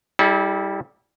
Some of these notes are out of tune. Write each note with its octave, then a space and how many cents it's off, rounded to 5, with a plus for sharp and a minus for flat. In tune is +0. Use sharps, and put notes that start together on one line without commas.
G3 +0 E4 -35 A4 -45